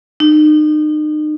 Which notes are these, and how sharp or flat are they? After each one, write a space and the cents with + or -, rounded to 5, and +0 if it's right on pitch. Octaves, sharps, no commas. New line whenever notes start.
D#4 -35